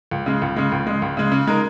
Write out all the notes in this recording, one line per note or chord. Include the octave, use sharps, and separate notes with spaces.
C#2
C#3 G#3
C#2
C#3 G#3
C#2
C#3 G#3
C#2
C#3 G#3
C#3
G#3 D#4 A#4